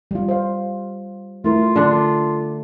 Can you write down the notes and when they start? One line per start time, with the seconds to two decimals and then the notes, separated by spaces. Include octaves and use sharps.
0.11 G3 F4
0.28 C5 F5
1.44 A3 E4 F4 A#4
1.76 D3 D4